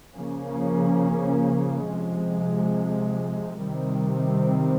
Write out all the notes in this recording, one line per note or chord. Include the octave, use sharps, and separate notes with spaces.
C#3 F3 A#3 C#4
C3 F3 G#3
C3 D#3 G3 C4